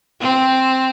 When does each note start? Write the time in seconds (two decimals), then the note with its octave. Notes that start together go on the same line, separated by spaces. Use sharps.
0.21 C4